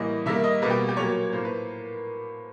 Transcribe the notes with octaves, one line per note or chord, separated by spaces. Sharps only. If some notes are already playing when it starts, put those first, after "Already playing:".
Already playing: A2 E3 G3 A#3 D#5
D#3 G3 A#3 E5
D#5
B2 G3 A#3 B4
G4
G4
A#2 F#3 A#3 C#5
A2 F3 A#3 C5
B4